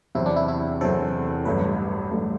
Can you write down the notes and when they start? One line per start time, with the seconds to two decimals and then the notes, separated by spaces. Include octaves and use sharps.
0.15 E2 C3 F#3 C4 E4
0.26 D4
0.36 E4
0.48 E4
0.81 E2 C3 F#3 C4 A4
1.45 A1 G2 F#3 A3 B4
2.11 A1 G2 F#3 A3